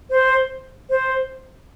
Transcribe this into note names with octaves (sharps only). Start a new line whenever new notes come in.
C5
C5